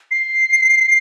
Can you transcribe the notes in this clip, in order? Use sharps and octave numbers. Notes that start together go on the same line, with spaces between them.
C7